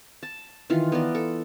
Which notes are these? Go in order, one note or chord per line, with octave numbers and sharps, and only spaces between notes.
A5
D#3 E3 F4
B3 A#4 D5
A4